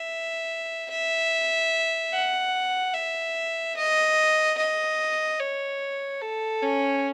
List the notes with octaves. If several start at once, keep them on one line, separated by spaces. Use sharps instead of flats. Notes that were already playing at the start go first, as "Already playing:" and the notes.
Already playing: E5
E5
F#5
E5
D#5
D#5
C#5
A4
C#4